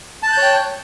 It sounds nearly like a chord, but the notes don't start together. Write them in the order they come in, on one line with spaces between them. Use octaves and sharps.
A5 F#6 G6 C#5 G5